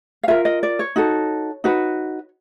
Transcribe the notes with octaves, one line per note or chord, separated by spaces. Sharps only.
F5
F4 A#4 E5
D#5
D5
C#5
D#4 F#4 A4
D#4 F#4 B4